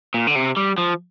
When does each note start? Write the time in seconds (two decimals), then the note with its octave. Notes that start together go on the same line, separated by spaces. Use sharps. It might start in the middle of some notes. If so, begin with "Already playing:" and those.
0.14 A#2
0.27 D3
0.35 C3
0.57 G3
0.78 F3